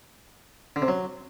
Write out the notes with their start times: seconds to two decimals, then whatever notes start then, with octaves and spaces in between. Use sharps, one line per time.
0.76 D3
0.82 C3
0.88 F#3